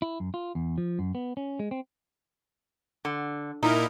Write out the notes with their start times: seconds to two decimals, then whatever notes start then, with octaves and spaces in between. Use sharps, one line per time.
0.02 E4
0.20 F#2
0.34 F4
0.55 E2
0.78 F3
0.99 F#2
1.15 B3
1.37 C#4
1.59 G#3
1.71 C4
3.05 D3
3.63 A#2 D#4 E4 A#4